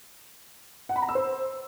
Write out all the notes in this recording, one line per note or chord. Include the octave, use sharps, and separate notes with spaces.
F#5
B5
A#5
E6
C5